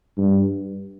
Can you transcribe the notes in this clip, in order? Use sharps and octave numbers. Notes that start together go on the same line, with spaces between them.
G2